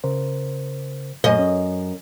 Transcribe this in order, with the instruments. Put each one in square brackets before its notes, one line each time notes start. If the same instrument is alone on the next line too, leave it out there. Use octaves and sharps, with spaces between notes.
[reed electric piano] C#3 A#4 C5
[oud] F#2 D#5 [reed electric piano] A#2 A3
[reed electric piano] C#4